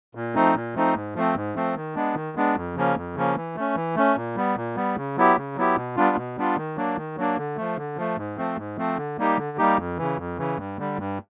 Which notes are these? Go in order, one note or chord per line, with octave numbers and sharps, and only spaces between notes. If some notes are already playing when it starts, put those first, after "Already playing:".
A#2
F3 A3 C4 D#4
A#2
F3 A3 C4 D#4
G#2
F3 A3 C4
G#2
F3 A3 C4
D#3
G#3 B3 D4
D#3
G#3 B3 D4
F2
C#3 F3 A#3 C#4
F2
C#3 F3 A#3 C#4
E3
A3 C#4
E3
A3 C#4
A#2
G3 B3
A#2
G3 B3
C#3
F#3 B3 E4 G4
C#3
F#3 B3 E4 G4
B2
G3 B3 D4 F4
B2
G3 B3 D4 F4
D#3
F#3 A#3 D4
D#3
F#3 A#3 D4
D3
F3 A3
D3
F3 A3
G#2
F3 A3 C4
G#2
F3 A3 C4
D3
G3 A#3 D#4 G4
D3
G3 A#3 D#4 G4
F2
C#3 E3
F2
C#3 E3
G2
D3 G3
G2